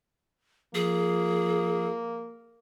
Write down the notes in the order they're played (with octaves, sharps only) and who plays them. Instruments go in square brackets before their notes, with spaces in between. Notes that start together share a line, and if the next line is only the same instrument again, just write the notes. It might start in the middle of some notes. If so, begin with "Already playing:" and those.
[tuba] F3 [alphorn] A#3 [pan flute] G#4